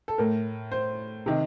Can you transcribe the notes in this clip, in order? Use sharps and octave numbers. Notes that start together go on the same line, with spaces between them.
A4
A2 A#4
C5
C3 D#3